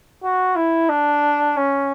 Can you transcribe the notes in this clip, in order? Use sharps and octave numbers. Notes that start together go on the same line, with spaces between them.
F#4
E4
D4
C#4